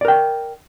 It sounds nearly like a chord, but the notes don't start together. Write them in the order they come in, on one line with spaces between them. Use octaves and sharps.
D5 A#4 G5